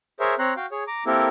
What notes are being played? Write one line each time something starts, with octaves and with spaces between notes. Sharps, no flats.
G#4 A#4 C5 C#5 E5
C4 C#5 A#5 C6 F#6
F#4 F5 G5
G#4 C#5
A#5 D6
A#3 C4 E4 G4 A4 A#4